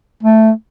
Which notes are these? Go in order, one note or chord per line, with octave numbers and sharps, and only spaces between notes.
A3